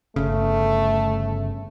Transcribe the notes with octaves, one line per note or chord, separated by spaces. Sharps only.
G1 C#3 A3